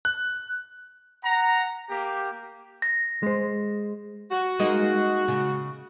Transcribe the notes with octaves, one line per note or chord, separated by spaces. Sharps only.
F#6
F#5 A#5
A#3 G4
A#6
G#3 C5
F#4
G#3 A#3 D#4
C#3